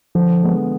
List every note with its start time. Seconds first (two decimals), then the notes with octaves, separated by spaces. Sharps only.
0.15 D3 F3
0.43 G#3 B3